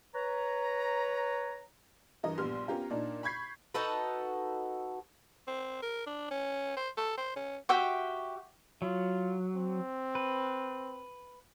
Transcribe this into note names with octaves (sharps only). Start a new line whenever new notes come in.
B4 C#5 A#5
G2 E3 A#4 D#5
A#1 G3 B3 C6 F6
B3 C#4 F4 G4 A#4
A#2 D4 D#4
B5 C#6 G6 G#6 B6 C7
D#4 F#4 A4 B4
C4
A#4
D4
C#4
C5
A4
C5
C#4
F#4 G4 E5 G5
F#3 F4
C4
B4